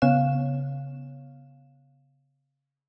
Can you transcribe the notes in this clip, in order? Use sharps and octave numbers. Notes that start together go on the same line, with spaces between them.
C#3 B3 C#5 F5 E7